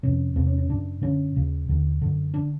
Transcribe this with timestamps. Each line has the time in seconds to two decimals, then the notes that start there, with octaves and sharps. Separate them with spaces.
0.03 F2 C3 C#4
0.36 E2 C3 C4
0.47 C#4
0.58 C#4
0.69 F#2 C#3 D4
1.02 F#2 D3 C#4
1.36 D#2 C#3
1.68 D#2 D3
2.02 F#2 D3
2.34 D3 D4